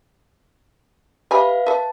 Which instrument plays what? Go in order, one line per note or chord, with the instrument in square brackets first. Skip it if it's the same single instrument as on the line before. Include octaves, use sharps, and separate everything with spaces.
[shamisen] G4 G#5 B5 [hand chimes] B4 E5 F5
[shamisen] B4 E5 [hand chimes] A5